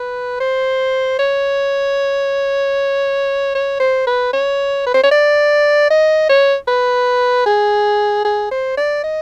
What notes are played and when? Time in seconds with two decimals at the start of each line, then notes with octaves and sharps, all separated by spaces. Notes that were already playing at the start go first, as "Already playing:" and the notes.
Already playing: B4
0.40 C5
1.19 C#5
3.55 C#5
3.80 C5
4.07 B4
4.33 C#5
4.86 B4
4.94 C5
5.03 C#5
5.11 D5
5.90 D#5
6.29 C#5
6.68 B4
7.46 G#4
8.25 G#4
8.51 C5
8.77 D5
9.03 D#5